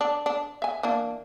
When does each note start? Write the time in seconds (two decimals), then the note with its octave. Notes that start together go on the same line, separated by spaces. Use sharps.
0.01 D4
0.26 D4
0.62 E5 G#5
0.83 E3 A#3 D4